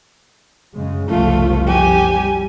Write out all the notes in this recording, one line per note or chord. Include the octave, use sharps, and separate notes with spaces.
F#2 C#3 G#3
F#1 C2 F3 A3 F4
G4 G#5
G3